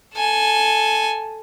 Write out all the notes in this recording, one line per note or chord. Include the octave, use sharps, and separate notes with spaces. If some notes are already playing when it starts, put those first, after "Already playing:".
A4 G#5